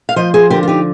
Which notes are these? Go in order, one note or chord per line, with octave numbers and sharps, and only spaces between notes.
F5
F3 C5 D#5
G#4 C5
D3 G4 A#4
F4
D#4 G4